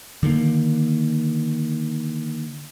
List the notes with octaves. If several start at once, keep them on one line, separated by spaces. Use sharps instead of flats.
D3 D#3 G#3 A#3